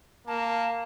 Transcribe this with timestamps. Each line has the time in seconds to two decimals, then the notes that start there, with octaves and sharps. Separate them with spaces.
0.27 A#3 A5